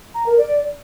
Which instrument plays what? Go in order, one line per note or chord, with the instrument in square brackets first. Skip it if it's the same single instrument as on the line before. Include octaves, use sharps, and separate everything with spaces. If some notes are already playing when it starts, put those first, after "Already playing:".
[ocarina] A#5
A#4
D5